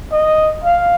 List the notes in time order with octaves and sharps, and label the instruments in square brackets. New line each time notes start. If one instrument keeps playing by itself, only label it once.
[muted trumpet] D#5
F5